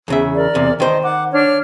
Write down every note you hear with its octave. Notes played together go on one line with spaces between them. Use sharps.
E2 C#3 E5
A#4 D5
E2 C3
D#3 C5 D#5 G5
F#5 D6
D4 C#5 F6